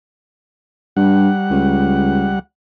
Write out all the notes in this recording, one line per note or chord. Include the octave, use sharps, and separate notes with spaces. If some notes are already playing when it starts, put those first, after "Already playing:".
G2 G3 F#5
C#2